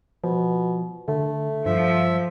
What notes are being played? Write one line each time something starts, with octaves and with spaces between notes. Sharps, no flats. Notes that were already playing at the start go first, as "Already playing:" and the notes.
B2 F3
D3 A3
G2 F3 E5